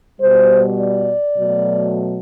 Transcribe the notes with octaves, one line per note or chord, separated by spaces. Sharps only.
B2 G3 C5
D5
B2 F#3 A3